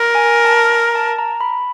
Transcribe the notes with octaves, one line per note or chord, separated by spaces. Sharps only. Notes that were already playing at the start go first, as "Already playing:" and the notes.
Already playing: A#4
G#5
A5
A#5
A5
A#5
B5